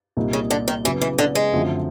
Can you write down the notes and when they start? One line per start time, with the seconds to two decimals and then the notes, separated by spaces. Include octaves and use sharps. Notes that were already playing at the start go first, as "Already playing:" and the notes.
0.17 C2 A#2 G3 A#3 D#4
0.33 C#3
0.51 D3
0.68 D#3
0.85 C#3 E3 F#3 B3
1.01 E3
1.18 D3
1.35 G#3
1.52 F#2 D3 F3 A3 C4